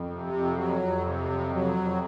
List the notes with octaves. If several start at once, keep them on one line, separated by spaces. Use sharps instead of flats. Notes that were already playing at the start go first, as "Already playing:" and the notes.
Already playing: F2
C3
F2
F#3
F2
C3
F2
F#3
F2